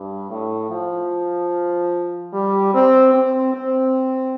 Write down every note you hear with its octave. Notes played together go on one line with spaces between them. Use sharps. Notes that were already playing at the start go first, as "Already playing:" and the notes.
Already playing: G2
A2
F3
G3
C4
C4
C4